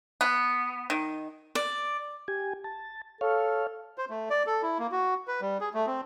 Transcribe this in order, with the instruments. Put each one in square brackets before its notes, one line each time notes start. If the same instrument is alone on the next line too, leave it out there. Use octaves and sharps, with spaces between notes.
[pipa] B3
D#3
[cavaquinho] D5
[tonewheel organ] G4 G#5
A5
[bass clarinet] A4 [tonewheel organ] C#5 F5
[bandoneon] C5
A3
D5
A4
E4
A#3
F#4
B4
G3
G#4
A3
C4